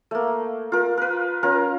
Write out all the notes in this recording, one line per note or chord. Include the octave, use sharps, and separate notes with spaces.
A3 A#3
F4 A#4
A#4 B4
C#4 F4 A#4 A#5